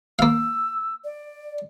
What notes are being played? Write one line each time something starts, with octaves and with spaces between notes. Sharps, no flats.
A#3 F5 E6
D5